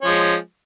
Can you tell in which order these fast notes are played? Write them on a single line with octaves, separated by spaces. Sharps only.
C#4 F3 G#3